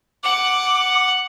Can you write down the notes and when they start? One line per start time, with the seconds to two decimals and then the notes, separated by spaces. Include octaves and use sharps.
0.23 F#5 D6